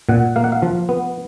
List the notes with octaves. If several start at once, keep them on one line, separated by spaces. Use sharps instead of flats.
A#2 F#5
A#3 F5
F#5
F5
F3
B3